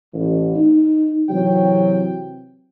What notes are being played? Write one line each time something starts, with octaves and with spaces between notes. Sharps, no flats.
A1
D#4
C3 E3 F#3 C4 G5